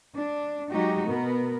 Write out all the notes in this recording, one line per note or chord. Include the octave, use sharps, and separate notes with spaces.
D4
F#3 G#3 D#4 F#4 G4
B2 B3 A#4